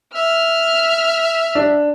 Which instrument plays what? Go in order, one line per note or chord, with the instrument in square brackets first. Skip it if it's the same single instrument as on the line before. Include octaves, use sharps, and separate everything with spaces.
[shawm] E5 [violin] F6
[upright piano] D4